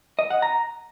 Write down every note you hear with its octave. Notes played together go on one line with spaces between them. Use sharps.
D#5
F#5
A#5